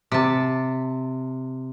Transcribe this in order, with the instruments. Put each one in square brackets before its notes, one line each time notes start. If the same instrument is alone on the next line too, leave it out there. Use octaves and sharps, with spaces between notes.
[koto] C3 A5